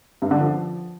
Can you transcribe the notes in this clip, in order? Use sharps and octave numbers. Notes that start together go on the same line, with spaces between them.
G2
D3
F3